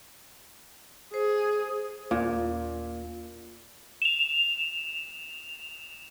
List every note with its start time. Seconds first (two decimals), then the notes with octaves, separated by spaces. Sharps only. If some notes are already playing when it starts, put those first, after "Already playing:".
1.14 G#4 C5
2.11 D#2 A#2
4.02 E7 F7